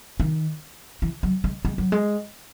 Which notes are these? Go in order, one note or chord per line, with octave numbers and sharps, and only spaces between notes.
D#3
E3
F#3
G#3
G#3
F#3
G#3